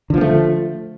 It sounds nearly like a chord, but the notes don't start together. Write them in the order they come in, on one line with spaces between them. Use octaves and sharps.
D3 F3 B3 A3